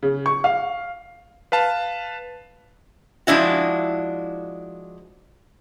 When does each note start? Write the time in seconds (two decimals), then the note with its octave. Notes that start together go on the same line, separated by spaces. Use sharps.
0.03 C#3
0.26 C#6
0.44 F5
1.52 B4 F5 A5
3.27 F3 G#3 D4 E4 F#4